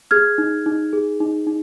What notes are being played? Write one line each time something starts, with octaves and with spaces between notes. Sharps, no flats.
G#4 F6 G#6
D#4
D#4
G#4
D#4
D#4